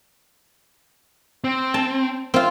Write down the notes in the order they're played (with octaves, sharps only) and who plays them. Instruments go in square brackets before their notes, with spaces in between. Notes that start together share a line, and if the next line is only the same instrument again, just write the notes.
[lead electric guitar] C4
[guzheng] A5
C4 F4